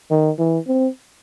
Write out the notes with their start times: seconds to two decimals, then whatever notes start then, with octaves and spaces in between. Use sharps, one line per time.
0.11 D#3
0.39 E3
0.68 C4